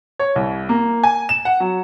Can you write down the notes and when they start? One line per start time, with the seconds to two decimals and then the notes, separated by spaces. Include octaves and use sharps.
0.19 C#5
0.36 C2
0.69 A#3
1.04 G#5
1.29 E7
1.45 F#5
1.60 F#3